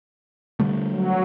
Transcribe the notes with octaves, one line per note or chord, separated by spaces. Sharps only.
D3 G3 A3
F#3